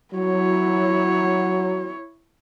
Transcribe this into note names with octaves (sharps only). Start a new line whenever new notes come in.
F#3 E4 C#5